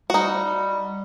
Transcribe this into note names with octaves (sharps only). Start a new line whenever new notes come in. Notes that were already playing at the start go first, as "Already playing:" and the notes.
G3 D#4 F#4